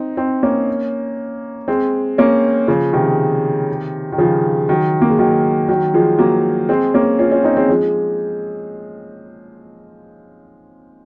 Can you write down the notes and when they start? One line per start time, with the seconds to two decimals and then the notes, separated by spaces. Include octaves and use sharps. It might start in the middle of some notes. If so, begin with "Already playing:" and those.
Already playing: C4 D#4
0.17 C4 D#4
0.43 A#3 C#4
1.68 G#3 C4
2.18 A#3 C#4
2.68 C#3 F3
2.93 C3 D#3
4.12 D#3
4.18 C#3 F3
4.69 D#3 F#3
5.02 A#3
5.10 G#3
5.19 D#3 F#3
5.69 D#3 F#3
5.94 F3 G#3
6.19 F#3 A#3
6.69 G#3 C4
6.94 A#3 C#4
7.19 C#4 F4
7.32 C#4 F4
7.44 C4 D#4
7.57 G#3 C4
7.69 F3 G#3